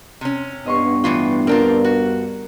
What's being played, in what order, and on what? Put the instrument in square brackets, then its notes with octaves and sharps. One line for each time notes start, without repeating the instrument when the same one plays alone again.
[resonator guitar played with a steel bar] C3 C#4
[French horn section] G2 B3 [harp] D#5 C6 C#6
[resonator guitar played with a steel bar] A2 E3 F4
[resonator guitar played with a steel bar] C4 D4 F4 [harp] A#4
[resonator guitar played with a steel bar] F#4